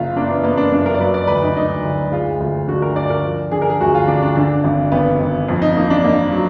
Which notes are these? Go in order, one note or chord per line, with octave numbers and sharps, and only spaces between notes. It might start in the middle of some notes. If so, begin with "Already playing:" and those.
Already playing: F#1 F4
A#3 D4
B3
A#3 B3
D4
F#2 D4
A#4
D5
F#3 B4
D5
D2 B4
D#4
D3 D#4
D2
G#3 F4
D2
D3 F#4
A#4
D3 D5
A#4
F3
D3 G#4
A#4
G#4
D2 F#4
F4
D3 D4
D4
D3 D4
G#1
G#1 B3
G#1
F2
D#4
A#3 D#4
D4
A#3 D#4
F#3